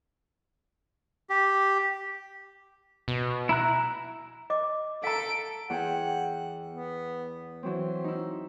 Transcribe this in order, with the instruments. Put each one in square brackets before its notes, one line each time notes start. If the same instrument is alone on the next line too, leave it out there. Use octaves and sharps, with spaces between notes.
[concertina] G4
[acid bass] B2
[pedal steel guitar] E4 A#5 F#6
[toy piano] D#5 D6
[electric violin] A4 D7 [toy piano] F5 A#5
[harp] E2 G#4 G5 [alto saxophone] F#5
[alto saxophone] B3
[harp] E3 F#3 C4 [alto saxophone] C5
[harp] D#4 E4